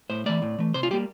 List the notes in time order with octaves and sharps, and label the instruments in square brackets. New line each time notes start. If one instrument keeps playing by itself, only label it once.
[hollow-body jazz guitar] A2 C5
E3 A3 D5
A2
E3 A3
C3 C5
F4
G3 A#3 G4